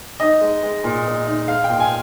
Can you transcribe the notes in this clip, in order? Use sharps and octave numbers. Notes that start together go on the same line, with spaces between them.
D#4 D#5
G#3
G#3
A#2
A#2
D#4
G#3 F5
A#2 G5
G#5